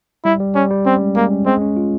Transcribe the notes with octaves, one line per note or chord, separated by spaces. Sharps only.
G3 E4
G3
G3 C#4
G3
C4 C#4
G#3
G#3 A#3
C#4
G#3 C4
C#4
F4